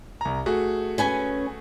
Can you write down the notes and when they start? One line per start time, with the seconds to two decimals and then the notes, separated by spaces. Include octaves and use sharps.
0.21 C2 A#5
0.46 A3 F#4 G#4
0.98 C#4 B4 G#5